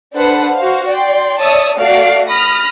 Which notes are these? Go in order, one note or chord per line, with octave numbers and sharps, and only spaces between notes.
D4 A4 B4 C5 F#5
F#4 C5 F5
D5 G5 C6
C#5 D5 E5 A5 D#6 E6
A3 F#4 D5 F5 C7 D7
B5 D#6 F6 A#6